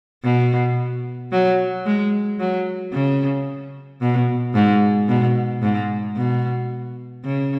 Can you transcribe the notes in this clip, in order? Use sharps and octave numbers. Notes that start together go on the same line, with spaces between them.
B2
F#3
G#3
F#3
C#3
B2
G#2
B2
G#2
B2
C#3